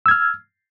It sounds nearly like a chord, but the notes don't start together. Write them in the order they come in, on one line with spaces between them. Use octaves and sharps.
E6 G#6 F6